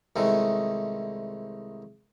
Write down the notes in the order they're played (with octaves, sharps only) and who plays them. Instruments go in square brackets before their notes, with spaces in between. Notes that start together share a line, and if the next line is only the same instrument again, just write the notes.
[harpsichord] C2 D#3 G#3 A3